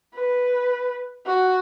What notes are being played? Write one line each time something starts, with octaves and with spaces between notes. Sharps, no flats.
B4
F#4